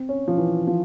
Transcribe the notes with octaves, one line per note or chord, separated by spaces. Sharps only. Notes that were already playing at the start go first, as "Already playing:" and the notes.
Already playing: C4
C#4
F3
E3
F3